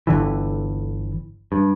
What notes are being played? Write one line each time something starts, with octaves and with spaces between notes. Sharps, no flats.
G1 D3 E3
G2